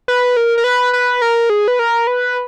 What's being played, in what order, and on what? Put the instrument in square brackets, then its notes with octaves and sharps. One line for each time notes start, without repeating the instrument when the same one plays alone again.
[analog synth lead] B4
A#4
A#4
B4
B4
A#4
G#4
B4
A#4
B4